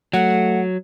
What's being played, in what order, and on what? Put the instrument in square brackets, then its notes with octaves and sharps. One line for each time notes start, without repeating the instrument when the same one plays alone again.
[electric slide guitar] F#3 [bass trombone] A3 [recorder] F#5